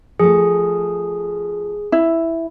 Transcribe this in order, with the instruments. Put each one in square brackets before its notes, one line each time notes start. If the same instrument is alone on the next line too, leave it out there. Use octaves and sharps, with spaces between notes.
[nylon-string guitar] F3 A3 [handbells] G#4
[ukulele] E4